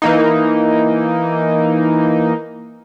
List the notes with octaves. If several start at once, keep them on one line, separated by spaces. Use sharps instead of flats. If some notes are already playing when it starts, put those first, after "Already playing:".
E3 A#3 D#4